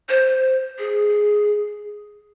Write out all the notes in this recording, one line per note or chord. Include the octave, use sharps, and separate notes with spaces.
C5
G#4